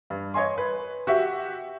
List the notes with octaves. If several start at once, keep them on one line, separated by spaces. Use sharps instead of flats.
G2
C#5 D#5 G#5 C6
B4
F#4 G4 E5